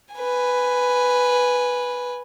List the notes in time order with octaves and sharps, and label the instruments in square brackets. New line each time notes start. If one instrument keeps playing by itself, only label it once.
[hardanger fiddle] B4 G#5